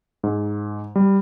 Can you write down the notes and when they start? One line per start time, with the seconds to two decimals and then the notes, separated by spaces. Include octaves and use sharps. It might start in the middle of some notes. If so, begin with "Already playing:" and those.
0.23 G#2
0.96 G3